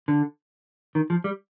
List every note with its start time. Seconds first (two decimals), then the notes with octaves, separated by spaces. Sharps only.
0.08 D3
0.95 D#3
1.10 F3
1.24 G3